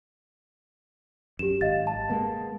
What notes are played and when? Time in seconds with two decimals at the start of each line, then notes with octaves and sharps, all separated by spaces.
1.39 F#2 G4 E7
1.61 G#1 D#5 F5 A6
1.87 A5
2.09 G#3 A#3 B3